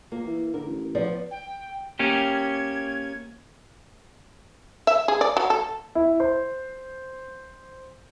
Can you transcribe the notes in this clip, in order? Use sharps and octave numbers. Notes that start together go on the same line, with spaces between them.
A#2 A#3
E3
D3 A#4
A1
F3 B3 D5
G5
A#3 C#4 G4 G#6
E5
G#4
D5
F#3
A4
E4
C5